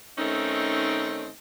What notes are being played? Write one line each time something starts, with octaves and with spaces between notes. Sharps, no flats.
D#3 A3 C4 C#4 D#4